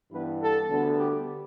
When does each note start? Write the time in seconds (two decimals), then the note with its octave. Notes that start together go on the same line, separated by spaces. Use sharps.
0.12 G2 E3 G3 B3 B4
0.41 A4
0.70 D2 D3 G3 B3
0.99 G4